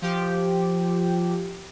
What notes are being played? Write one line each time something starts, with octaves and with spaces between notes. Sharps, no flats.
F3 G4